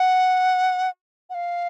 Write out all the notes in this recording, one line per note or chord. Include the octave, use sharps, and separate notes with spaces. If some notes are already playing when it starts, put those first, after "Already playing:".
Already playing: F#5
F#5
F5